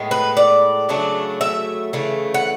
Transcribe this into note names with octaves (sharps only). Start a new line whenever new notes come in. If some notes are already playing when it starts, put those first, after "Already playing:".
Already playing: A2 G#3 B3
B4
D5
C#3 F#3 A3 D4
E5
C#3 E3 A3
F#5